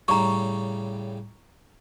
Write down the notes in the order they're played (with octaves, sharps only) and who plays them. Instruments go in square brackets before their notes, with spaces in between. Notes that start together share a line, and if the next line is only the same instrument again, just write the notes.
[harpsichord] A2 C#3 G3 [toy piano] A#5 C#6